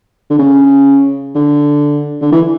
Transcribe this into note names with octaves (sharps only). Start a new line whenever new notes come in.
D3
C#3
D3
D3
E3